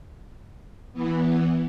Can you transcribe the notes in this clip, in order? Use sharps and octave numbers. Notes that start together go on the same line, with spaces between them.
E3 B3